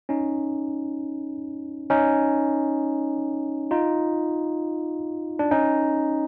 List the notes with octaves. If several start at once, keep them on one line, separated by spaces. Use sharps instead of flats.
C#4 D#4
C#4 D#4
D#4 F4
D4
C#4 D#4